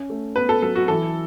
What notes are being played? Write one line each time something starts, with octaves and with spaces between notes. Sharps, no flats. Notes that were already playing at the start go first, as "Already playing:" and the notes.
Already playing: C#4
A3
B3 B4
A4
F#3 A4
F#4
E3 A4